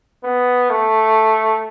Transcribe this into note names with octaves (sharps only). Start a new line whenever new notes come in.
B3
A3